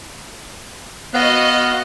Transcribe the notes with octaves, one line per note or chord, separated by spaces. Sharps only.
B3 F#4 D#5 F5 F#6